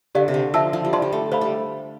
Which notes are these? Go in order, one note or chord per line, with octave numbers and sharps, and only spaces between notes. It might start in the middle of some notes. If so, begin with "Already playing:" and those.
D3 G4 D5 F5
C3
D3
F3 E5 A5 E6
F3
G3
F3 D5 A5 C6
G3
A3
A3 C5 F5 B5
G3